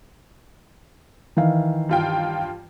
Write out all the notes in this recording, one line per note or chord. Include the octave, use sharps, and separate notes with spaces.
D#3 E3 F5
G2 F4 G5